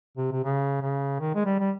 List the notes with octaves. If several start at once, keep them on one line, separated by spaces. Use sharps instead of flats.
C3
C3
C#3
C#3
D#3
G#3
G3
G3